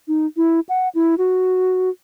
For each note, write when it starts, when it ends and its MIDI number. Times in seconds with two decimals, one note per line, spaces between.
0.08 0.26 63
0.37 0.60 64
0.69 0.89 78
0.95 1.15 64
1.18 1.90 66